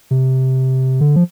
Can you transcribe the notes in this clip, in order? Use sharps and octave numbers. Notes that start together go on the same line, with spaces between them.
C3
D3
F3